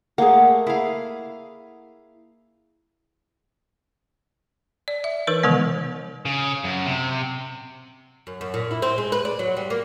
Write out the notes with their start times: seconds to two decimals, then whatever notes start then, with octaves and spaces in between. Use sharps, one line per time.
0.18 A3 A#3 G#4 F#5
0.67 E4 G#4 F5
4.88 D5
5.04 E5
5.27 E3 D#4 A#4 B4
5.43 C3 D#3 F3 G#3 B3
6.26 C#3
6.64 F#2
6.86 C3
8.27 F#2
8.41 F#2
8.54 A#2
8.71 E4
8.82 C4
8.98 G#3
9.12 B4
9.25 D5
9.39 F#3
9.57 G3
9.70 A#3